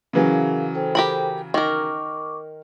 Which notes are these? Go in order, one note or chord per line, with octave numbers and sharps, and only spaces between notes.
C#3 E3 F#3 G#4 A#4 F5
A4 C5 G5
G4 A#4 B5
D#3 A#4 C#6 D6